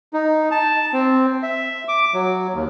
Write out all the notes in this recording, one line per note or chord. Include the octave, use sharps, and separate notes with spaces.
D#4
A5
C4
E5
D6
F#3
D#2